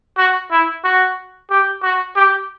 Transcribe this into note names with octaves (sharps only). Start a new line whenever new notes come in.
F#4
E4
F#4
G4
F#4
G4